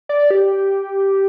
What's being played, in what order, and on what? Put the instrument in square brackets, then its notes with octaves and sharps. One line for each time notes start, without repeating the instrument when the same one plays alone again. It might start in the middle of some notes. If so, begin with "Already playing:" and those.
[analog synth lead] D5
G4